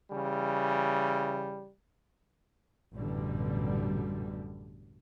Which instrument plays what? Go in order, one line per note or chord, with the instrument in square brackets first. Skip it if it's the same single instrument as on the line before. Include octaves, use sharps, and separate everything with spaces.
[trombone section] C#3 E3 G3
[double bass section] A1 F#2 B2 D3 G3